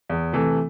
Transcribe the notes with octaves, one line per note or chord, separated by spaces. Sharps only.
E2
C3 E3 A3